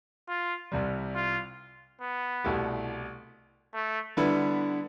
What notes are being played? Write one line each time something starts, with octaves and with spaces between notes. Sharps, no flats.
F4
C2 C3 G3
F4
B3
C2 B2 A3 E4 G4
A3
D3 G3 B3 E4 B4